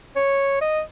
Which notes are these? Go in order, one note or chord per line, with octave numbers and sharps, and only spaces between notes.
C#5
D#5